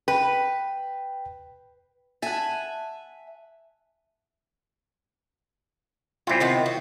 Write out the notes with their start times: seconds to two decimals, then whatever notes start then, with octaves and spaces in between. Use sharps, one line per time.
0.08 B4 G5
2.22 E5 F#5 G#5 A5
6.27 A#2 G3 C4 E4 F4
6.40 C3 D#3 B3
6.66 F#4